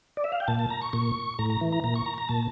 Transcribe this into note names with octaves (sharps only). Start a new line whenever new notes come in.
D5
E5
F5
G5
A#2 A5
A5
A#5
C#6
A#2 C#6
A2 A#5
A#5
E3
A#5
A#2 A#5
C#6
A#5
A#5
A#2 A5